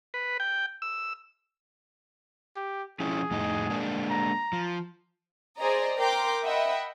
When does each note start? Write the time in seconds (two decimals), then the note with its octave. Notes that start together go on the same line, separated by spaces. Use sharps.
0.14 B4
0.40 G5
0.82 E6
2.56 G4
3.00 F3 C#4 E4 G#4
3.31 F2 A2 D#4
3.70 G#3 A#3 D4
4.11 A#5
4.53 F3
5.58 G#4 C5 D5 D#5 A#5
5.98 A#4 G5 A#5 C6 D6 G6
6.43 D#5 E5 F#5 G5 B5